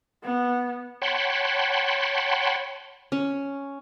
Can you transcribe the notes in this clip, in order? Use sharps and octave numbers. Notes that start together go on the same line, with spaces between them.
B3
C#5 F#5 G5 A5 B5 C6
C#4